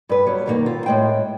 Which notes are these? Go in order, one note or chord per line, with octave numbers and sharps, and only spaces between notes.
G2 B4
F#3 G3 B3
G2 B2 D#3 G3 A#3
C4 F4
A2 G#3 G5